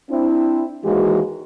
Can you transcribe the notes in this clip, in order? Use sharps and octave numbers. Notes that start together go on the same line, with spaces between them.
C4 D4 E4
D#2 G#2 E3 G#3 A#3 F#4